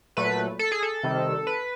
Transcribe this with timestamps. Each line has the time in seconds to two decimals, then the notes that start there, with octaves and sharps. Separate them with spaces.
0.17 A#2 F#3 A3 B4
0.59 A4
0.72 G#4
0.83 A4
1.03 C3 D#3 G3
1.47 B4